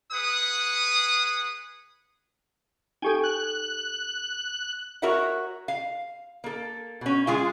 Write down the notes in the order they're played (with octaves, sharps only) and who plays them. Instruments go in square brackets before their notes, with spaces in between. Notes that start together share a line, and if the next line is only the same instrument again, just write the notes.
[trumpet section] G#4 B4 F#5 D#6
[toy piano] D#4 G4 A4 [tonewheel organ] G5 G#5
[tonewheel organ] F#6
[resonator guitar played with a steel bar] F#4 A#4 C#5 E5 F#5
F5
A#3 A4
B2 C#4
G#3 C#4 F4 G#4 F5 G#5